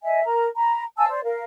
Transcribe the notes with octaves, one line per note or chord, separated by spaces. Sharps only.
D#5 E5 G#5
A#4 A#5
A#5 B5
F5 G#5 A5 E6
C5 D5
A#4 F5